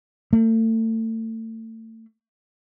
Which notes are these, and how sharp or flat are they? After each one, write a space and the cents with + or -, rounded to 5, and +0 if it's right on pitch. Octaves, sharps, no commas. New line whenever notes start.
A3 +35